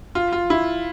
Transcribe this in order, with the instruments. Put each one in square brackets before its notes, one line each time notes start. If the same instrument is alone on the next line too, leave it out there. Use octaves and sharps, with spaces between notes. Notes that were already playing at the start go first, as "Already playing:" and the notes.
[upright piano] F4
F4
E4